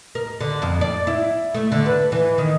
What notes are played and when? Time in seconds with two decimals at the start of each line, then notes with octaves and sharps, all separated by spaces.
0.15 A#4
0.40 D3
0.62 F2
0.81 D5
1.07 E4
1.54 A3
1.72 D3
1.86 B4
2.12 E3
2.38 D#3